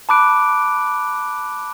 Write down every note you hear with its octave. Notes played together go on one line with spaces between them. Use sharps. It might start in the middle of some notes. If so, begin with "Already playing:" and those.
A5 B5 D6 F#6 D7